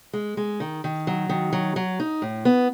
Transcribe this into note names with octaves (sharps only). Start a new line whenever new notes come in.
G#3
G#3
D#3
D#3
F#3
D#3
F#3
F#3
D#4
A2
B3